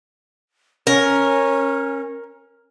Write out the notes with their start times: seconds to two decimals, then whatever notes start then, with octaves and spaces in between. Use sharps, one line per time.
0.87 C#4 A#4